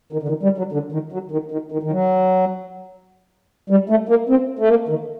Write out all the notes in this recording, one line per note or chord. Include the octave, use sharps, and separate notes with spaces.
D#3
D3
D#3
G3
F#3
D3
D#3
F#3
D#3
D#3
D#3
D#3
F#3
G3
A3
A#3
C4
A3
A#3
D#3